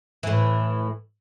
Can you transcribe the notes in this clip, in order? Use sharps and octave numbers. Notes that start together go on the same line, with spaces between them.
A2 E3